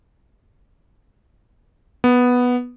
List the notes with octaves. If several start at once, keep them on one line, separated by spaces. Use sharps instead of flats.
B3